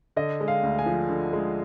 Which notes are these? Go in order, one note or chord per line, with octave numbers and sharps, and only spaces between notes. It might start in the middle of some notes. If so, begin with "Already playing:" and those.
D3 D#5
G#3
F5
D2
G#5
F3
D3
G#3